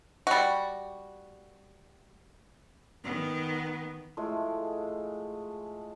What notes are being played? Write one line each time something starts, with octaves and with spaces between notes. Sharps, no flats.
G3 F#4
D#3 B3
A2 F3 G#3 A3